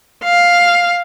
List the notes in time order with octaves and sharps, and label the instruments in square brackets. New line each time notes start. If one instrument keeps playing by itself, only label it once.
[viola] F5